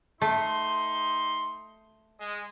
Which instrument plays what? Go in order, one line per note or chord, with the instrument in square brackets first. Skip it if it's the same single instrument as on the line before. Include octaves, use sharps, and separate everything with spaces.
[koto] A3 [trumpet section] D#4 C6
[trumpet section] G#3